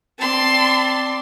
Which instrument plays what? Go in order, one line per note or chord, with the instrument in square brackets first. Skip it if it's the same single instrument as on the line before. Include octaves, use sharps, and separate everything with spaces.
[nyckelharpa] C4 D5 [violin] A5 C6